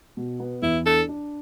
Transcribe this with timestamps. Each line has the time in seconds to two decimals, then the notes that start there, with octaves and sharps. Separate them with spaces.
0.17 B2
0.40 B3
0.62 E2 E4
0.85 D4 A4
1.08 D4